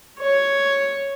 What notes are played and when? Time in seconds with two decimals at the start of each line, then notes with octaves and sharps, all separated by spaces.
0.19 C#5